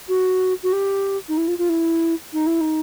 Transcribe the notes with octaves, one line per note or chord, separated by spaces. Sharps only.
F#4
F#4
G4
D#4
E4
F4
F4
E4
D#4
E4
D#4